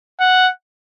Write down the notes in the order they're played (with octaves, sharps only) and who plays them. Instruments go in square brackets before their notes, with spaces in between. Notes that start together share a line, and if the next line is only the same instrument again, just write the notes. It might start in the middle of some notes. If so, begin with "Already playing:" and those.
[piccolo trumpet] F#5